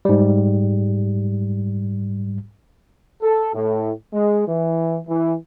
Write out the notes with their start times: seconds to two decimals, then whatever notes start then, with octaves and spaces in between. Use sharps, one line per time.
0.05 G#2 G3
3.22 A4
3.54 A2
4.14 G#3
4.47 E3
5.08 E3